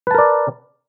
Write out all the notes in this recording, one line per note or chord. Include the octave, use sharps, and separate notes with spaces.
A#4 B4 D5 A5